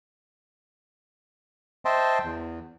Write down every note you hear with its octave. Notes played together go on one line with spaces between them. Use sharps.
C5 D#5 E5 G5 A5 C6
E2